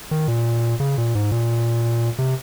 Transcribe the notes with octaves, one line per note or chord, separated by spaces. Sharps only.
D#3
A#2
C#3
A#2
G#2
A#2
C3